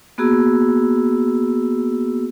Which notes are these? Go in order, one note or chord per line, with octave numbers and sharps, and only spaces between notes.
A#3 B3 F#4 G#4 E6